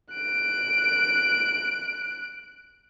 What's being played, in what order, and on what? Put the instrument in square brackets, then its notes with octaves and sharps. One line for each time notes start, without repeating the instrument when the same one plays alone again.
[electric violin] F#6 D7